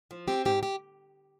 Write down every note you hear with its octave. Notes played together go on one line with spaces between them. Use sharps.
F3
C4 G4
G#2 G4
G4